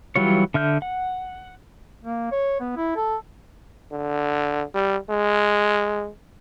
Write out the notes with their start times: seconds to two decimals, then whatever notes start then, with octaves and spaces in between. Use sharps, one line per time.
0.16 E3 F#3 G3 F4 C#5
0.54 D3 E5 F6 G6
0.82 F#5
2.03 A#3
2.32 C#5
2.60 B3
2.76 E4
2.96 A4
3.92 D3
4.74 G3
5.10 G#3